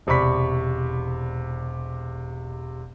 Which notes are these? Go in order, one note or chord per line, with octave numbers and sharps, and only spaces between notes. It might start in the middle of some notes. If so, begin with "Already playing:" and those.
E1 C3 D5 B5 C#6 B6